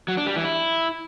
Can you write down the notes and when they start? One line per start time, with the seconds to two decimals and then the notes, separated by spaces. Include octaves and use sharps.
0.08 F#3
0.17 D4
0.26 G3
0.36 E3
0.45 E4